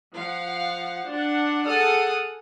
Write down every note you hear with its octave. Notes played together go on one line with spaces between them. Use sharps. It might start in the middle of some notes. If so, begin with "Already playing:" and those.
F3 F5 F#5
D4 F#5
G#4 A4 F#5 D#6 F6